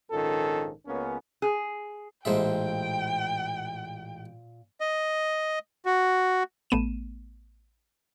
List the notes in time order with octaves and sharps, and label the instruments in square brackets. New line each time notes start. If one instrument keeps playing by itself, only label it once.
[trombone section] A#1 G#2 D#3 F3 C#4 A4
C#2 A#3 B3 C#4
[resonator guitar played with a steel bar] G#4
[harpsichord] A1 G#3 E5 [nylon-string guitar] A#2 C5 [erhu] G5
[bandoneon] D#5
F#4
[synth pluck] A1 A3 B3 D#7 E7